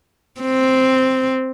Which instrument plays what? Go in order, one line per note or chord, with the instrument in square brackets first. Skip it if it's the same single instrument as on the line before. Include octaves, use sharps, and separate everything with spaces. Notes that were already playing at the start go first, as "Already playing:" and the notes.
[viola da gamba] C4